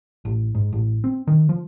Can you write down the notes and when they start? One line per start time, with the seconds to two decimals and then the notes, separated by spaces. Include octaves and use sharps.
0.25 A1
0.55 G#2
0.73 A1
1.04 C4
1.27 D#3
1.49 F3